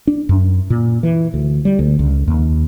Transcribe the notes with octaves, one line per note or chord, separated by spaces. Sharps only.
D4
F#2
A#2
E3
D2
G3
D2
C#2
D#2